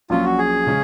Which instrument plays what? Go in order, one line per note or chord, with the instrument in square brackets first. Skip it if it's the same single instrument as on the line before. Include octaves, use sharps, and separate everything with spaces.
[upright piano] A#1 A#2 F#3 C#4 [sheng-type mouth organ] F4
[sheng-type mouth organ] F#4
G#4
[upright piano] C#3 G#3 C#4